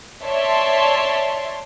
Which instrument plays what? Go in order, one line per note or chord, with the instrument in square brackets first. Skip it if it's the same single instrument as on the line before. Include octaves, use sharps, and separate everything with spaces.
[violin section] C#5 D5 E5 A5 C6